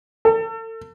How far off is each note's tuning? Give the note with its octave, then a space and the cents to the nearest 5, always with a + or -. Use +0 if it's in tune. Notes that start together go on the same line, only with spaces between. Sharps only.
A4 +35